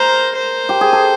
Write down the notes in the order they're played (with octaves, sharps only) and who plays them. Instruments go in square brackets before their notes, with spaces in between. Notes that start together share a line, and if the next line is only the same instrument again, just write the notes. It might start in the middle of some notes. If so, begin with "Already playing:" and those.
Already playing: [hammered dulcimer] A#4 [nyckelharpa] C5
[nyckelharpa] C5
[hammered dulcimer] G4
G#4
A4